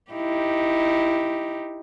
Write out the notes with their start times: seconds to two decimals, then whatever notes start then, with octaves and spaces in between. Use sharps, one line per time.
0.12 D#4 E4 G4